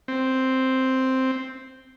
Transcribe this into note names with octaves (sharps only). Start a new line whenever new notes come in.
C4